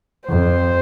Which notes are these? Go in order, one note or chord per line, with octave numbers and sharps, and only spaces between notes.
F2 C5